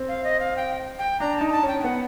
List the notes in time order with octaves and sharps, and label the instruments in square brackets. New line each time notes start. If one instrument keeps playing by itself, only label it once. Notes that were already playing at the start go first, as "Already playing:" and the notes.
Already playing: [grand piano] C4
[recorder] F5
D#5
F5
G5
G5
[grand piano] D4 [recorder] A#5
[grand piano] D#4 [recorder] A5
[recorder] A#5
A5
[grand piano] C#4
[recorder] G5
G5
[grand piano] B3 [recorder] F#5